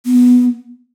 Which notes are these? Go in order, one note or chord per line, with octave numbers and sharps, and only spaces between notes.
B3